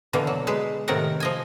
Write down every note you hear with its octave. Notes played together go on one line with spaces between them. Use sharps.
B2 D3 E3 A#3
F#3
G#3 B4
A2 C3 D#3 A#4 F#5
F3 D#5 G#5